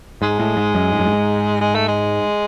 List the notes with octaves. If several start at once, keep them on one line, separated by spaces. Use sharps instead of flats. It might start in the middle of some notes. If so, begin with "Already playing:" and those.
G#2 G#3
A2
G#2
F#2
G#2
F#2
G#2
G#3
A3
G#3